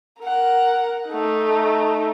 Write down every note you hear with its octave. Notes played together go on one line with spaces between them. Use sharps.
A#4 F#5
A3 D#4